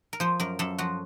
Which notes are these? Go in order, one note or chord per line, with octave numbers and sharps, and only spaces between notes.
A#4
F3 C5
F#2 A#4
F#2 A4
F3 F#4